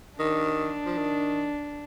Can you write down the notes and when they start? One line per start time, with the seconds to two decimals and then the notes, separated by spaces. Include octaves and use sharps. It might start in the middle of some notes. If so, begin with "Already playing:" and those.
0.19 D#3 D4
0.85 F3
0.98 D#3